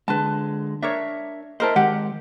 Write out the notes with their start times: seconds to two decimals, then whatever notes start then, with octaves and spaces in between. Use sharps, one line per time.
0.08 D3 G#3 B4 A5
0.82 D4 A#4 C#5 E5
1.60 E4 A#4 C5 D#5 E5 A5
1.76 D#3 G#3 G4 F#5